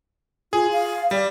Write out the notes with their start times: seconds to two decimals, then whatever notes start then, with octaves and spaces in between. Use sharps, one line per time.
0.53 F4 G#4
0.73 F5
1.11 G3 D5